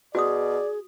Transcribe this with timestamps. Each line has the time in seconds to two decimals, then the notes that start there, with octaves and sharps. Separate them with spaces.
0.15 B2 F#4 G#4 D5 D#6